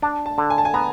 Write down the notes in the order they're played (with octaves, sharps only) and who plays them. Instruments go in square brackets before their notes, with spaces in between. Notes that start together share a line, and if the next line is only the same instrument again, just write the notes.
[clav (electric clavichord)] D4 [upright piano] A5
[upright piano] A5
[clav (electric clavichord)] D3
[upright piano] G#5
A5
G#5
[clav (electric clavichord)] B3 [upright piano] A#5